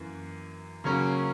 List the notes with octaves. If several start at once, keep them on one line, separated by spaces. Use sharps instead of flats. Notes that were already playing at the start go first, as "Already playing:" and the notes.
Already playing: F#2 E3 A#3
C#3 F#3 A#3 C#4